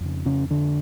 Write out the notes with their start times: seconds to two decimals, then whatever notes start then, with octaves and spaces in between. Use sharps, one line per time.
0.01 F2 C#3
0.25 C#3 C#4
0.51 D3 D4